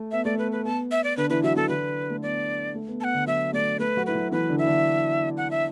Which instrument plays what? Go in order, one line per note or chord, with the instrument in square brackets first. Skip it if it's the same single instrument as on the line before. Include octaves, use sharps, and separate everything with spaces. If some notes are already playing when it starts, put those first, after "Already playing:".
Already playing: [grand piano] A3
[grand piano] B3 [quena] E5
[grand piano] A3 [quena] D5
[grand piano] B3 [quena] B4
[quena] B4
[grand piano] B3 [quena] A5
[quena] E5
D5
[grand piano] D3 D4 [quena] B4
[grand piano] E3 E4 [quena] B4
[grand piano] F#3 F#4 [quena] E5
[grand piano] E3 E4 [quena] A4
[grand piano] D3 D4 [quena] B4
[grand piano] A3
[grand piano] B3 [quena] D5
[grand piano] A3
B3
[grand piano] B3 [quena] F#5 A5
[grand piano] D3 D4
[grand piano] F#3 F#4 [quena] E5
[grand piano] A3 A4 [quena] D5
[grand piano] A3 A4 [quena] B4
[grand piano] F#3 F#4
[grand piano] E4 [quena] B4
[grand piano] F#3 F#4
[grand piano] E3 E4 [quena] B4
[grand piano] D3 D4
[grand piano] E4 [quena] E5
[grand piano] D3 D4
[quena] F#5
E5